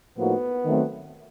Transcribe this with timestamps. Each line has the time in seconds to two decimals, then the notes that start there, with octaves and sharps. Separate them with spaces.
0.17 A2 F3 A#3 B3 D#4 F#4
0.65 D#3 F#3 A3 C4